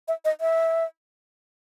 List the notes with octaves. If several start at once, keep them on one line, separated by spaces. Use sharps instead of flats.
E5
D#5
E5